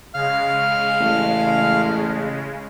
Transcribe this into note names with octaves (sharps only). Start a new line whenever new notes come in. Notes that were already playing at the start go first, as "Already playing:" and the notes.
C#3 G#3 F5 F6
A1